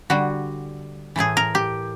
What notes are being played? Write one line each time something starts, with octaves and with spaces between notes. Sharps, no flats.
D3 G3 F#4
A2 E3 A3 G#4
A#4
G4